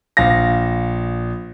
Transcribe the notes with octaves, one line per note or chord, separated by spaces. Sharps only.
A#1 F5 A#6